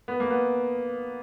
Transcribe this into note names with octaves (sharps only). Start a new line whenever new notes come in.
B3
A#3
B3